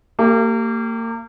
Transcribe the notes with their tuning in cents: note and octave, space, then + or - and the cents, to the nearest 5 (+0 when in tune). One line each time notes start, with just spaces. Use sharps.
A#3 -35 G4 +0